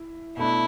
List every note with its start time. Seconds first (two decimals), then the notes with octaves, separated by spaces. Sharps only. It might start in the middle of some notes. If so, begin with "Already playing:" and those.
Already playing: E4
0.37 B2 A3 D4 E4